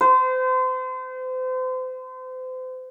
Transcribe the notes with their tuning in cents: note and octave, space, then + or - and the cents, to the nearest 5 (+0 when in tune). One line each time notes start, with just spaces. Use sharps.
C5 -35